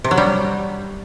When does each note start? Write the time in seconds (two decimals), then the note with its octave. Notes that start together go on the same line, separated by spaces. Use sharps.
0.04 C3
0.11 F#3
0.18 G3